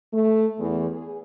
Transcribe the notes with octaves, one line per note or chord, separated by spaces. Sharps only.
A3
E2
G#4